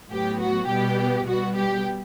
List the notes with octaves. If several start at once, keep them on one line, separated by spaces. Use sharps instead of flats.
A2 F#3 B3 G4
F#4
B2 G3 B3 G4
B2 G3 B3 F#4
G4